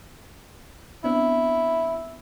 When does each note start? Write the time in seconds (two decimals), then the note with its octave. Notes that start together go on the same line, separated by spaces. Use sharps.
1.04 B3 C4 D4 E4